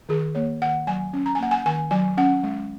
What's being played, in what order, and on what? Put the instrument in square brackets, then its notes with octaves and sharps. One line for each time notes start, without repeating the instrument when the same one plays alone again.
[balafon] D#3 G#4
A#3 C#5
D#3 F#5
F#3 G#5
C#4
A#5
G#5
A#3 F#5
G#5
D#3 G#5
F#3 G#5
C#4 F#5
G#3